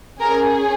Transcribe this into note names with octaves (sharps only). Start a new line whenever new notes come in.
C#4 G#4 A#4